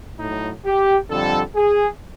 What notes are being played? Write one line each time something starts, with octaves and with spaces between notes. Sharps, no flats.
A2 F#3 D#4
G4
F2 D3 G3 A4
G#4